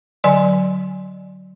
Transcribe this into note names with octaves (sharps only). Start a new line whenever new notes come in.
D3 F#3 D5 G#5 C6